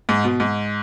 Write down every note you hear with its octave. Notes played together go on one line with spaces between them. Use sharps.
G#2
B2
G#2